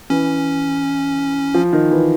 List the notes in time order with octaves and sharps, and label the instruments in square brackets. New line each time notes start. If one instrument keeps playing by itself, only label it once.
[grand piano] E3 [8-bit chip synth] C#4
[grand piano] F3
D#3
E3